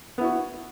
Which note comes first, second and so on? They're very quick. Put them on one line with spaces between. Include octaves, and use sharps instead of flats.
B3 E4 F#4